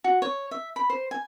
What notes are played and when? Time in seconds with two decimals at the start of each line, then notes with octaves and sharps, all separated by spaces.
0.04 F#4
0.22 C#5
0.51 E5
0.76 B5
0.90 C5
1.11 G#5